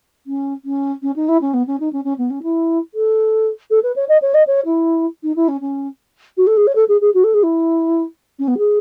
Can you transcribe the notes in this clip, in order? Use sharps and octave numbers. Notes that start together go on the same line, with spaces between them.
C#4
C#4
C#4
D#4
E4
C#4
B3
C#4
D#4
C#4
C#4
B3
C#4
E4
A4
A4
B4
C#5
D#5
C#5
D#5
C#5
E4
D#4
E4
C#4
C#4
F#4
A4
G#4
C#5
A4
G#4
G#4
F#4
A4
G#4
E4
C#4
B3
G#4